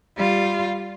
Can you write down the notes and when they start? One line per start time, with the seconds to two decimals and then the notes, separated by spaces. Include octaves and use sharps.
0.17 G3 F4